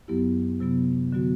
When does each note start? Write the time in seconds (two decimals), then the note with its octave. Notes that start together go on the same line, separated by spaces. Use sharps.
0.08 F#2 F#3 B3 E4 G4
0.60 C3 F#3 B3
1.12 D3 F#3 B3 F#4